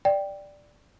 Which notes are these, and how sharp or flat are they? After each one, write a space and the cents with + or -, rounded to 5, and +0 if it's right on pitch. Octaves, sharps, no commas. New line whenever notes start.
D5 +0 G5 +0